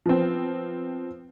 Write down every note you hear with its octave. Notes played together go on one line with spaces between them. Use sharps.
F3 B3 C4